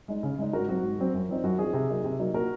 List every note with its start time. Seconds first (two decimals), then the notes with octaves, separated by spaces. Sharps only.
0.08 G#3 D#4
0.23 C#3
0.38 G#3 D#4
0.53 G#2 F#4 A#4
0.68 F#3 C4 F#4
0.83 G#2
0.99 F#3 C4
1.13 F#2
1.29 F3 C4 D#4
1.44 F#2 F#4
1.59 F3 C4 D#4 G#4
1.73 C3
1.90 F#3 A#3 D#4
2.04 C3
2.19 F#3 A#3 D#4
2.34 A#2 F#4 A#4